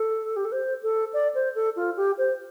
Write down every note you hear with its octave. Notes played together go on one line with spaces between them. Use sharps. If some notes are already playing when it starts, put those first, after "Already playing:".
Already playing: A4
G4
A4
C5
A4
D5
C5
A4
F4
G4
C5